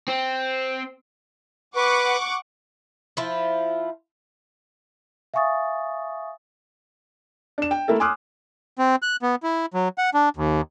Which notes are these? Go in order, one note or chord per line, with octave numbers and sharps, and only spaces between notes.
C4
B4 F#5 C#6 D6
F3 E4 F4
E5 F5 G#5 C#6 D#6 A6
D4 E7
G5
A3 A#3 E4 A4
G#5 C6 D6 D#6 F6 F#6
C4
F#6
B3
E4
F#3
F#5
D4
D#2